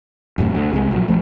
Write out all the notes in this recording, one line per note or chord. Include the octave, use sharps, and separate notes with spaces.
E1 F#2 A2 C3
D2
C2 C3 G#3
A#1 F#3
A#1 F2 F3 A3